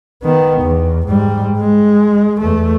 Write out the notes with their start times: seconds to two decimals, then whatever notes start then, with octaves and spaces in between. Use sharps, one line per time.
0.23 D#3 B3
0.62 E2
1.07 G#2 G3
1.58 G#3
2.41 E2 A3